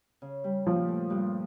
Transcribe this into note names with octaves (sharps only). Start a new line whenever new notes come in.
C#3
G3
A#2 F3
A3
G2